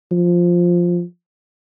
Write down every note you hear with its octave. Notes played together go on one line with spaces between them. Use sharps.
F3